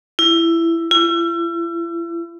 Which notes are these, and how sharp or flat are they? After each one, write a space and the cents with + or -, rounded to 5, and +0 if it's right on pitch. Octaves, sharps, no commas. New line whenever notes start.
E4 +15
E4 +40